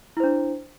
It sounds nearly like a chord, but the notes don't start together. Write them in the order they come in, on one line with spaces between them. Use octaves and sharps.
E4 C5 D4